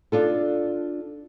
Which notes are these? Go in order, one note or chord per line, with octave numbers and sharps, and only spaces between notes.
D4 F4 A4